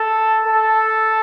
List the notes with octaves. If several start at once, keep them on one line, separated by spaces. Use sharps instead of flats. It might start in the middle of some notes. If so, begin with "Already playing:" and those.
Already playing: A4
A4